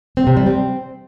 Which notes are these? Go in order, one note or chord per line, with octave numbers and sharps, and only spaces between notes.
C4
C3
G3
C4